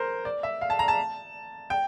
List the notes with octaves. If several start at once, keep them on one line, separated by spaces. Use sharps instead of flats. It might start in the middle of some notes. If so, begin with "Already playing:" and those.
Already playing: A#4 C5
D5
E5
F5
A5
A#5
A5
G5